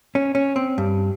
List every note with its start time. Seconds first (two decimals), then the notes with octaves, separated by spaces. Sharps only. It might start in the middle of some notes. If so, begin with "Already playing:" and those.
0.15 C#4
0.35 C#4
0.56 C4
0.78 G2